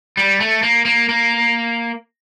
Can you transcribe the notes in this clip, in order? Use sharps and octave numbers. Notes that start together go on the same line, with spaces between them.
G3
A3
A#3
A#3
A#3